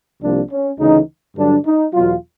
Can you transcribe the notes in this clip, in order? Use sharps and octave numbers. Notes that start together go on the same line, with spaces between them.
C2 C3 F3 A#3 D4
C#4
D2 C#3 E3 D#4
G2 D3 F#3 D4
D#4
E2 B2 F#3 F4